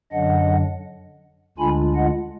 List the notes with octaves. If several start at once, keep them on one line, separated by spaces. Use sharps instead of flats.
F#2 D3 F#3 D4 D#5 F#5
D2 D3 G#3 D4 F4 G#5 B5
D#5 F#5